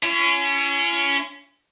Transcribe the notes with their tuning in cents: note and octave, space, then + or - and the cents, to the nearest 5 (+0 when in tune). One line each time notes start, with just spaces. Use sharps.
C#4 +15 F4 -45